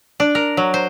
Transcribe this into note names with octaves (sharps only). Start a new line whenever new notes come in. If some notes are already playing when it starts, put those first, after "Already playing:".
D4
A#4
F#3
C5